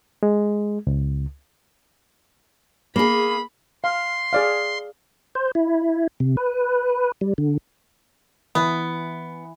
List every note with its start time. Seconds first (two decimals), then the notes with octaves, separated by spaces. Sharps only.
0.23 G#3
0.87 C#2
2.96 A#3 G#4 B5
3.84 F5 C6
4.33 G#4 D5 F5
5.35 C5
5.55 E4
6.20 C3
6.37 B4
7.21 G3
7.38 D3
8.55 E3 B3 B5